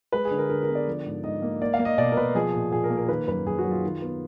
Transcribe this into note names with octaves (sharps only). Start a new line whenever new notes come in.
G#3 B4
G#4
D3
A#4
D3 A#4
A#4
B3
D5
F3
G#2
G#2 D#5
A#3
A#3 D5
F5
A#3
D#5
B2 D5
A#4
B2 B4
F3 G#4
A#2
A#2 G#4
A#4
A#3
A#4
D#3 B4
F#2 B4
F#2 G#4
F#4
F#3
F4
D#3
B3